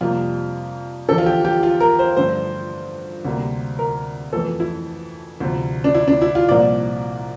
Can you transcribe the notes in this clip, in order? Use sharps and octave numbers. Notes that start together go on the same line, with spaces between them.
F2 C3 G3 A#3 F4
E2 D3 F3 A4
F4
G4
G4
F4
A#4
C5
G2 D3 F3 A3 C5
D2 C3 G3 A#3
A#4
F2 E3 A3 A4
E4
D2 C3 F3
D4
E4
D4
E4
F4
C2 A#2 F3 A#3 D5